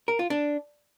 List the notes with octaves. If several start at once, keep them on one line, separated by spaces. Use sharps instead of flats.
A#4
F4
D4